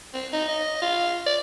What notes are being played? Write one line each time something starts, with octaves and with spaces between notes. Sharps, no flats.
C4
D#4
D#5
F4
D5